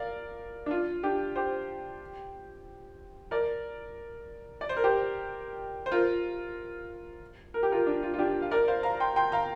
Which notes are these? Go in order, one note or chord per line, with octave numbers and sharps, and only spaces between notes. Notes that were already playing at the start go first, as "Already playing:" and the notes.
Already playing: A#4 D5 F5
D4
F4
D4 G4
G4 C5
A#4 D5
D5
C5
A#4
G4 C5
C5
F4 A#4
A#4
G4
F4 A#4
D4
F4
F4
D4 G4
F5
A#4 D5
C5 F5
F5 A#5
G5 C6
G5 C6
F5 A#5